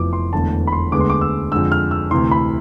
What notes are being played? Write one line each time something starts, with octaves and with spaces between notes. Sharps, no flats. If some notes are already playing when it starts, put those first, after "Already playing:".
Already playing: F1 F2 E3 B3 D6
C6
E1 E2 D3 A3 A5
B5
C6
D2 D3 G#3 B3 D6
C6
D6
E6
F2 D3 G#3 E6
F6
E6
D2 C3 E3 C6
B5